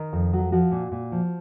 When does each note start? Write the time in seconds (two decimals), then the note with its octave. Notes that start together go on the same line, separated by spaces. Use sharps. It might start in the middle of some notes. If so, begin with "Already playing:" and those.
Already playing: D#3 A#4
0.13 F2
0.33 F#3
0.52 F3 F#4
0.72 A#2
0.92 A#2
1.12 F3